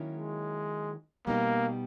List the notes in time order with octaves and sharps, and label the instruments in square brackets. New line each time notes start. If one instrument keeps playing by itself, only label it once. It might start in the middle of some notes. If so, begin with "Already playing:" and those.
Already playing: [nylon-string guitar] D#3 F#3 A#3 C#4 E4
[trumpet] G#3
[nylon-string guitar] B2 G3 B3 D#4 [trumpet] A#3